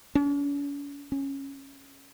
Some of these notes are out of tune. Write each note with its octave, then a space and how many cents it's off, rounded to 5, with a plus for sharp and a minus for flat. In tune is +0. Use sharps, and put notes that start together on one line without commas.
C#4 +45
C#4 -10